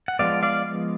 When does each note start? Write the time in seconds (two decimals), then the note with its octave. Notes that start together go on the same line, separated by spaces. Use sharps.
0.08 F#5
0.19 F3 G#3 B3 D5 F5
0.43 D5 F5